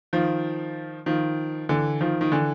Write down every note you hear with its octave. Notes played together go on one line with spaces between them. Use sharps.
D#3 F3
D#3 F3
D3 E3
D#3 F3
D#3
D3 E3